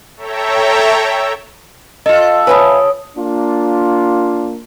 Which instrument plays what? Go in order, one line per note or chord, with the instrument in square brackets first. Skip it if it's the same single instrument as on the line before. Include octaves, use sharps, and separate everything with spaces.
[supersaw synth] A4 C#5 E5 G5 A#5
[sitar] F4 A4 [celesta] D#5
[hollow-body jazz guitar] B4 E5 F5 [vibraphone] C#5 D#6 [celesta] G#5 A5 B5
[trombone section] A#3 D4 F4